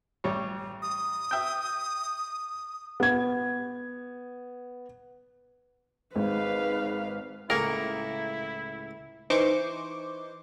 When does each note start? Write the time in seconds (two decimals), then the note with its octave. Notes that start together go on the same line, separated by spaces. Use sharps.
0.24 A1 G3 C#5
0.82 D#6
1.31 E5 G5
3.00 B3 G#6
6.16 G#1 G#2 B4 F5
7.50 C#2 A2 A#3 E4 G#4 A#4 C#6
9.30 E3 D#4 C5 C#6 D6